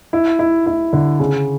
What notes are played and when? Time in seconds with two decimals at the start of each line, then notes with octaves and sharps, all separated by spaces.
0.13 E4
0.39 E4
0.66 E4
0.93 D3
1.19 C#3